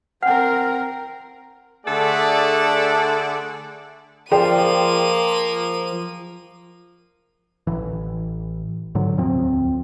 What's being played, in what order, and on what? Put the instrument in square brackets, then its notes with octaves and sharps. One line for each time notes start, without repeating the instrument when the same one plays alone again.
[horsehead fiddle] C4 A#4 [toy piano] F#5 [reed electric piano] G5 F6
[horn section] D3 A3 G#4 A4 D5 F#5
[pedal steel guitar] F3 [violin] A#3 D#7 [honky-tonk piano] G#4 D5 G5
[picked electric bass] A1 E3
G#2 D3 F#3
E1 D2 F3 C4